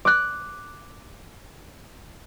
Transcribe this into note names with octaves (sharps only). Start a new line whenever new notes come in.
D6 F#6